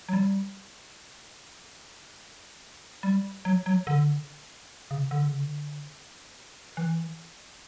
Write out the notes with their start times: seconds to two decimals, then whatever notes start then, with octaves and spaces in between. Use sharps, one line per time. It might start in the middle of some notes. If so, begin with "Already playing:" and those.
0.09 F#3
0.13 G3
3.03 G3
3.45 F#3
3.66 F#3
3.87 D3
4.91 C#3
5.11 D3
5.25 C#3
5.39 D3
6.77 E3